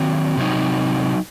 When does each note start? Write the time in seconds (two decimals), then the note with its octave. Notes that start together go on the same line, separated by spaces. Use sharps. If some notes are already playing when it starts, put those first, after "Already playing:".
Already playing: D#3 F#3 C4
0.37 C3 F#3 C4 D#4